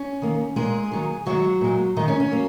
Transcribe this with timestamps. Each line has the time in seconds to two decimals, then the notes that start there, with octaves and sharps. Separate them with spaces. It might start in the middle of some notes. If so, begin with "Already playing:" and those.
Already playing: C#4
0.22 D#3 A#3
0.56 A#2 G#3 A#3 G#4
0.92 D#3 F#3 A#3
1.26 D#3 F#3 G#3 F#4
1.61 A#2 G#3
1.96 A#2 D#3 G#3 D#4
2.08 C#4
2.20 C#4
2.31 F#3 A#3